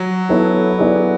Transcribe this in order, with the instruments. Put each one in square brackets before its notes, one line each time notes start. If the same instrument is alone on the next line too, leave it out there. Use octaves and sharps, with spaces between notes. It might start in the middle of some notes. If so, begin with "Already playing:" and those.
Already playing: [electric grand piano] F#3
[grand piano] B3 E4 A4 C#5
B3 E4 G#4 D5